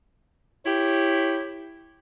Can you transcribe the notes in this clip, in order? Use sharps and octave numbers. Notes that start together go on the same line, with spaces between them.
E4 G4 C#5